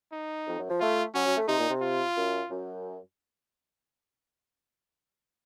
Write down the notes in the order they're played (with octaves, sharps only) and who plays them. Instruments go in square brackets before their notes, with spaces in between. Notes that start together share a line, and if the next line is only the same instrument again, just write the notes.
[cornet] D#4
[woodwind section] F2
F#2
F3
[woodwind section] A3 [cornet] F4
[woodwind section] F#3 [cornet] C#4
[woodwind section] F#3
A3
[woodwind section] C3 [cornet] D#4
[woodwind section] A#2
C3
[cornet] F4
[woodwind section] F#2
F#2